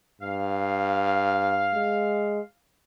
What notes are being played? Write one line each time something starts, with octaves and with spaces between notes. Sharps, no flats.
G2 F5
G#3